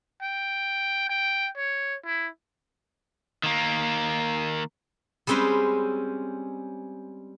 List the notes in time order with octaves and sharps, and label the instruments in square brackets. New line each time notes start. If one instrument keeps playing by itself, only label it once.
[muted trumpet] G5
G5
C#5
E4
[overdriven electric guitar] D#3 A#3
[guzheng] G3 G#3 C4 C#4 B4 C5